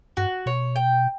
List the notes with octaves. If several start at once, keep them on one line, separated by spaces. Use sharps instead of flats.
G2 F#4
B2 C#5
G5